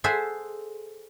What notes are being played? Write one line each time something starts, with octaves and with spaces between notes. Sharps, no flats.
G#4 A4 C5 E5 F#5 G#5